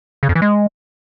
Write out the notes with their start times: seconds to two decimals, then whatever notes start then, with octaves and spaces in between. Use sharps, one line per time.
0.23 C#3
0.29 F2
0.35 E3
0.42 G#3